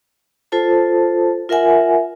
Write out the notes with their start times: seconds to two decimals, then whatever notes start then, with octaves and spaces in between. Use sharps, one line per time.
0.52 F4 A4 C5 A5
1.49 F4 A#4 E5 F#5 G#5